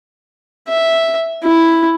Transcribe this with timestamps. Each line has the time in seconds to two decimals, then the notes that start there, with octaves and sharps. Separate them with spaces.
0.68 E5
1.43 E4